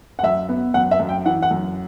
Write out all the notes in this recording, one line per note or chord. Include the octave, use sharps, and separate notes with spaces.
F#5
F#2 E5
B3
F#2 F#5
E5
F#2
G5
E3 F#5
F#5
F#2